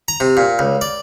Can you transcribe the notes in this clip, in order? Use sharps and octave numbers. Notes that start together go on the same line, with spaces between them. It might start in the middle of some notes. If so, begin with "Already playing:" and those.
A#5
C3
A#2
C#2
D5